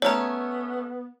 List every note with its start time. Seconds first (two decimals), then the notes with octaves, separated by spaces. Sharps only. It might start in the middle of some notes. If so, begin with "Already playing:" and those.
0.02 A3 B3 C#4 G#4 C#5 A#5